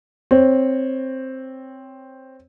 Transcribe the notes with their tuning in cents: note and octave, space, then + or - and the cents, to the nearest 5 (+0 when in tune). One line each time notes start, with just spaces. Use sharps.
C4 +5 C#5 +0